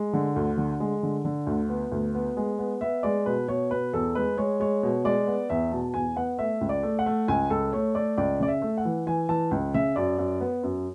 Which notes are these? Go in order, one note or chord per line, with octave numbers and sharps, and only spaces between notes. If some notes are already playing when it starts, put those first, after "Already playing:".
Already playing: G#3
D3
D2
D3
G#3
D3
D3
D2
B3
D2
B3
G#3
B3
B3 E5
G#3 D5
B2 B4
B2 C#5
B2 B4
E2 A4
G#3 B4
G#3 C#5
G#3 C#5
B2
G#3 D5
B3
E2 E5
B2 A5
E2 G#5
B3 F#5
A3 E5
C#2
D5
A3
F#5
A3
C#2 G#5
C#2 A4
A3 C#5
A3 D5
C#2 D5
C#3 D5
E5
A3
F#5
E3
E3 G#5
E3 A5
C#2
C#3 E5
F#2 D5
F#2
B3
F#2